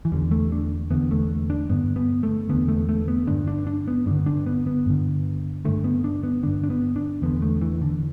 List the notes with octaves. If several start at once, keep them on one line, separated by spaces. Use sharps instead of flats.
E3
E2 D3 G3
A3
D4
E2 D3 B3
A3
D4
G2 D3 B3
B3
A3
E2 D3 B3
A3
A3
B3
G2 D3 D4
D4
D4
B3
G2 D3 D4
D4
B3
B3
G2 D3
G2 D3 A3
B3
D4
B3
G2 D3 D4
D4
B3
D4
E2 D3 B3
A3
E3
D3